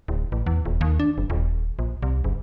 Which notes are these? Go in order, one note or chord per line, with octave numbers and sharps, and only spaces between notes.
D1
A1
E2
D#1
D#2
D4
F#1
D#1
A#1
C2
F#1